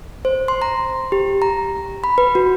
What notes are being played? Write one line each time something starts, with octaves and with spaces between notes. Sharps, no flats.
C5
C6
A#5
G4
A#5
B5
B4
F#4